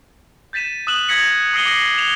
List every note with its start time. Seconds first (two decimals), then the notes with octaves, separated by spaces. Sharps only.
0.53 G6 A6 B6 D#7 E7
0.87 D#6 E6 F#6 E7 F#7
1.08 D#6 G#6 A#6 B6 C#7 F#7
1.53 D#6 A#6 C7 D7 D#7 G7
1.66 D6 D#6 A#6 C7
1.98 E7 F7 G7